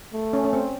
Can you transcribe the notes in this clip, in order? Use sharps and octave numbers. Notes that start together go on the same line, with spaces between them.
A3
C#4
C#4
C4